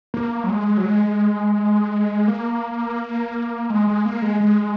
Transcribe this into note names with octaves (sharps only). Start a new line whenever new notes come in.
A#3
F#3
G#3
F#3
G#3
A#3
G#3
G#3
A#3
G#3
G#3